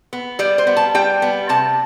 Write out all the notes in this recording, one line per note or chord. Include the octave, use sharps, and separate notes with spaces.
B3
G3 D5
C5
B3
A5
G3 G5
B3
C3 A5